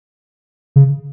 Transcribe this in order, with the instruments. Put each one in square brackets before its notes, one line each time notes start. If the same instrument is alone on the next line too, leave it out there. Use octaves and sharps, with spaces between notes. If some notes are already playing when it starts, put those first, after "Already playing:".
[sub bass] C#3